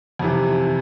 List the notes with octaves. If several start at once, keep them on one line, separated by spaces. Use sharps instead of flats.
F2 C3 E3